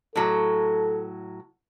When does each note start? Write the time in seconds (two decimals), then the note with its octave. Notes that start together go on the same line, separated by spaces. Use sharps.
0.16 A2 F#3 A4